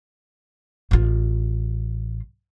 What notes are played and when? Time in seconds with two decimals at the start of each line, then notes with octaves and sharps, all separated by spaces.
0.91 A1 F4